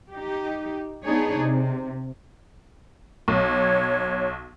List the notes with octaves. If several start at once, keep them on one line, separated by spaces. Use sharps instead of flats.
D#4 G4
B3 D4 D#4 G#4 C#5
C3
B1 C#5